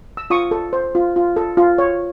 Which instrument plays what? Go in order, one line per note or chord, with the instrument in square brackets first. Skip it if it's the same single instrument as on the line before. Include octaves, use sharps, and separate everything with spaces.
[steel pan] E6
F4 C#6 D#6
A4
C5
F4
F4
A4
F4
C#5